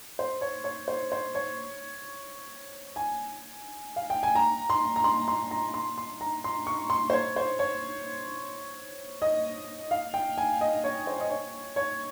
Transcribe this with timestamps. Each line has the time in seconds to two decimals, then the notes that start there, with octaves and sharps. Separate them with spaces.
0.19 C5
0.41 C#5
0.64 C#5
0.88 C5
1.12 C5
1.35 C#5
2.96 G#5
3.96 F5
4.10 G5
4.23 G#5
4.35 A#5
4.70 C6
4.96 A#5
5.04 C6
5.28 C6
5.51 A#5
5.74 C6
5.98 C6
6.21 A#5
6.44 C6
6.67 C#6
6.90 C6
7.10 C5
7.13 C#5
7.36 C5
7.59 C#5
9.22 D#5
9.91 F5
10.14 G5
10.38 G#5
10.61 D#5
10.84 C#5
11.07 C5
11.20 D#5
11.30 C#5
11.76 C#5